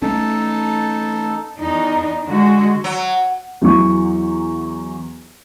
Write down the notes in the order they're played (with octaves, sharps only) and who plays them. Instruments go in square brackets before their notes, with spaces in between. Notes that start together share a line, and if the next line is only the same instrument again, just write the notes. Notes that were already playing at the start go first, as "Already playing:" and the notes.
[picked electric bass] A3 B3 C#4 [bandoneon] D#4 A4 A5
[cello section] E2 D4 D#4
D3 G#3 F#4
[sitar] F#3
[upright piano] E2 E3 F#3 C#6